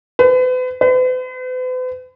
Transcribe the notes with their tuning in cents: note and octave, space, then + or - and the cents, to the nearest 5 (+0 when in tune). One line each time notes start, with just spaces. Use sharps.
B4 +40
B4 +45